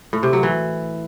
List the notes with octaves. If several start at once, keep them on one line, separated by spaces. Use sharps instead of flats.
A2
C3
F#3
E3